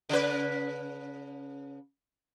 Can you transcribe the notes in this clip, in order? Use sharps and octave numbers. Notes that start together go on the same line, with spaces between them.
C#3 B4